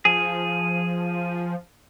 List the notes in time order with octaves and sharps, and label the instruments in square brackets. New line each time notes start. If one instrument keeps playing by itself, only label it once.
[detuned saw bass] F3 [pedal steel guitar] G#4